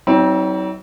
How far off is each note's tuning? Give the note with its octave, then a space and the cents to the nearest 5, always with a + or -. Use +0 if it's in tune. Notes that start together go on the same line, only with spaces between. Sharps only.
F#3 +40 C4 +0 D#4 +45